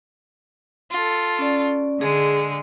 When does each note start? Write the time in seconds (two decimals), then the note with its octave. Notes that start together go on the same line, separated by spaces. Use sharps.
0.92 F4 A4
1.39 C#4 D5
2.01 D3 G#3 G#4